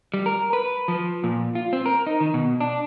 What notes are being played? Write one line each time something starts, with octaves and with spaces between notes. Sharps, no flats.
G3
A#4
B4
F3
A#2
F4
C4
A#4
D#4
D#3
B2
D4